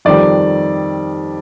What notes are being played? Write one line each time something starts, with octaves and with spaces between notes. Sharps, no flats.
F2 D#3 G3 D5